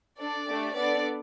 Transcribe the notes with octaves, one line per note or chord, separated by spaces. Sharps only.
D4 A4 D5
A3 D4 G4
B3 D4 A4 D5